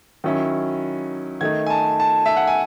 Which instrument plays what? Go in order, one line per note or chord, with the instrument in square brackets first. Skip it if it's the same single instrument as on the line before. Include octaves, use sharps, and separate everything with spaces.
[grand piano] D#3 F#3 C#4 E4
D#3 A3 D#4 G#6
G#5
A5
A5
E5
F#5
G#5